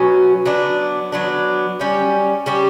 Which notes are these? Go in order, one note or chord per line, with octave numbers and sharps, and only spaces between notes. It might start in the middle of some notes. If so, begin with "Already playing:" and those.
Already playing: B2 F#3 C#4
F#3 B3 D4
F#3 B3 D4
G3 C#4 G4
G3 C#4 G4